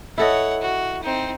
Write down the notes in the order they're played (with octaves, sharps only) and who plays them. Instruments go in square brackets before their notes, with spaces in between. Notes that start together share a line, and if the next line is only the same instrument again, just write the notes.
[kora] E4 A4 D#5 [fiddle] C#5 F#5
[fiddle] F#4
C4 D#4